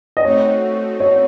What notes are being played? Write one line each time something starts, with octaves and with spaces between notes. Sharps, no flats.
D#5
A3 C4 D#4 F#4 C#5
C#5